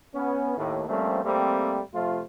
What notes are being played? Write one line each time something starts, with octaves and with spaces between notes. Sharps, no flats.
B3 C#4
D#2 A2
F3 G3 A3 A#3 C4 C#4
G3 A3 A#3 C4
C3 F3 A3 F4